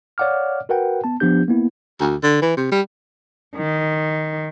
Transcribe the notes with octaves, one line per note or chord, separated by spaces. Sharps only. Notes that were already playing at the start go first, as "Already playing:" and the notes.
C#5 D5 F5 F#5 D6 F6
F#4 A#4 B4 F#5 G5
B3 A5
F3 B3 D4 G4 G6
A#3 B3 E4
D2
D3
E3
C3
G3
D#3